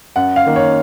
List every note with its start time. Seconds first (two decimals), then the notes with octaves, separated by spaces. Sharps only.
0.16 F#2 F#5
0.36 F5
0.46 D#3 A#3
0.56 C#5